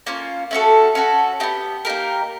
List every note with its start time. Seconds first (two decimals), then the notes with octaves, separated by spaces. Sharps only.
0.06 A#3 C#4 F4
0.51 A3 C#4 F#4 A4
0.95 C#4 F#4 A4
1.40 B3 D#4 G4
1.85 A#3 D#4 G4 A#4